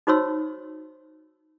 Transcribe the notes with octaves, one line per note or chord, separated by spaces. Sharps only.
D#4 F#4 C5 C#5 C6 E6